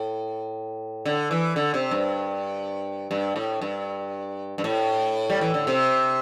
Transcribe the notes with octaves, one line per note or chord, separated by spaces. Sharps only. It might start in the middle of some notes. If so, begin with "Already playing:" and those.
Already playing: A2
D3
E3
D3
C3
G2
G2
A2
G2
G2
A2
G3
E3
D3
C3